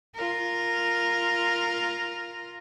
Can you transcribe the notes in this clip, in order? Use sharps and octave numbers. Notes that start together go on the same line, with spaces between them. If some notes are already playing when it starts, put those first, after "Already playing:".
F4 A#4